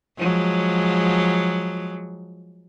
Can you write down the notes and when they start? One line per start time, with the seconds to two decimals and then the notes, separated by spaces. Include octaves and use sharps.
0.18 F3 F#3 G#3